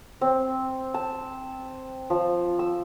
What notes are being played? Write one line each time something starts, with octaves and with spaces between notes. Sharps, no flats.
C4
A5
F3
E6